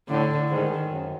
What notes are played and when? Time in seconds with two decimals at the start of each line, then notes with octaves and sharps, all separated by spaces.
0.08 A2 D3
0.49 G#2 D#3
0.89 F#2